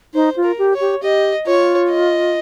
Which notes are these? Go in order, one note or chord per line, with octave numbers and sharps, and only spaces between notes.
D#4 C5
F4
A#4
G4
C#5
G4
G4 D#5
F4 C#5
D#5